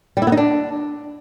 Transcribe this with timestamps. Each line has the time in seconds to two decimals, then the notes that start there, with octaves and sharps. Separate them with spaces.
0.17 G3
0.22 E4
0.27 B3
0.32 D#4
0.37 D4